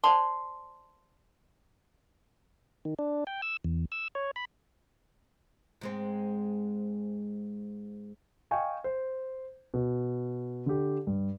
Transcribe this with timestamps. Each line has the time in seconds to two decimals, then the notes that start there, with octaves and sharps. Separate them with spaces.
0.04 C5 D5 A5 C6
2.85 D#3
2.99 D4
3.27 G5
3.42 E6
3.65 E2
3.92 E6
4.15 C#5
4.36 B5
5.81 G#2 G#3 C4
8.51 D#5 F5 G5 G#5 C#6
8.84 C5
9.74 B2
10.66 D3 G4
11.07 G2